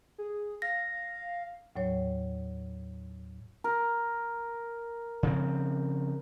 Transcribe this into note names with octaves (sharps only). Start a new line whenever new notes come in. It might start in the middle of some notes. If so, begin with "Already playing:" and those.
G#4
F5 A#6
D#2 A2 F#3 C#5
A#4
C#3 F3 C4